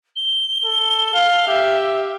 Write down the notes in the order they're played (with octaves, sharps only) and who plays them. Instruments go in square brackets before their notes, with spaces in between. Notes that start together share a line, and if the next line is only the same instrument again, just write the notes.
[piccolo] G7
[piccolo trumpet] A4
F5
[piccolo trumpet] G4 [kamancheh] E5